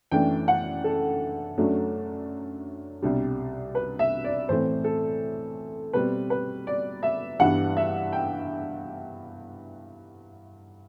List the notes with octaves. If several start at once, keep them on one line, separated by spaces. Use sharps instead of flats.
F#2 E3 A3 D4 G5
F#5
A4
F#2 F#3 A3 D4
C2 B2 G3 D4
B4
E5
D5
A2 E3 A3 C4 C5
A4
B2 G3 C4 B4
B4
D5
E5
G2 E3 G3 B3 D4 F#5
E5
G5